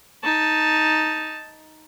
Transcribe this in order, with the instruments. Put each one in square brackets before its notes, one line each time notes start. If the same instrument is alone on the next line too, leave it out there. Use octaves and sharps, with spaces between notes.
[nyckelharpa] D#4 A5